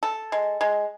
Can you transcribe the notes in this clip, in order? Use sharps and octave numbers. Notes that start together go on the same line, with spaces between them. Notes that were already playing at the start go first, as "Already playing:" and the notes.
A4
G#3
G#3